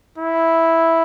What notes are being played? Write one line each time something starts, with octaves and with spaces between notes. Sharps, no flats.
E4